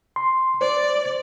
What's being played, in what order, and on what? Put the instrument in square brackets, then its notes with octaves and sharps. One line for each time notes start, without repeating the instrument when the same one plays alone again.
[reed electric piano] C6
[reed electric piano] C5 [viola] D5